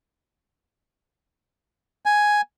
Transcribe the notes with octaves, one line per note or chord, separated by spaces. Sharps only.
G#5